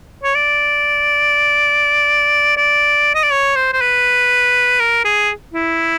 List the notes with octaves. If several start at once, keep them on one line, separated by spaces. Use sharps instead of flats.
C#5
D5
D5
D#5
D5
C#5
C5
C5
B4
A#4
G#4
E4